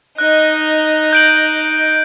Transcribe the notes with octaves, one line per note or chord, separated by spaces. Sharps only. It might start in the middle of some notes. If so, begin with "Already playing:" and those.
D#4 D#5 F#6
G6 D7 F#7